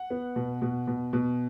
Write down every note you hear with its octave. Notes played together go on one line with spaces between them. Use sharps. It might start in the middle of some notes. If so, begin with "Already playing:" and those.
Already playing: F#5
B3
B2
B2
B2
B2